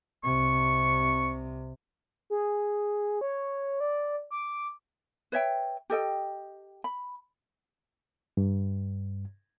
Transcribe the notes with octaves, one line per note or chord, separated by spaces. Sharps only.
C2 C3 C#6
G#4
C#5
D5
D6
B4 C#5 E5 G5
G4 A4 D#5 G5
B5
G2